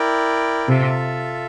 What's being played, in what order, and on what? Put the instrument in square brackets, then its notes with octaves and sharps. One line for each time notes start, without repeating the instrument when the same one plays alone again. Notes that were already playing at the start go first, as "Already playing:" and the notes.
Already playing: [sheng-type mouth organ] E4 A#4 D5 G5
[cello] C3 [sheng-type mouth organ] F4 A4 E5